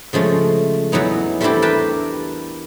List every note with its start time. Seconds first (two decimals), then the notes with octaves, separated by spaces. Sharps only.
0.13 C#3 F3 G#3 A3
0.92 E2 E3 F#3 B3 D#4
1.41 G3 A3 C4 D4 E4 G4
1.62 A#4 B4 E5 G5 A5